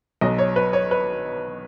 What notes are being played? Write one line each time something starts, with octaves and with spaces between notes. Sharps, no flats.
B1 B2 F#3 D#5
C#5
B4
C#5
B4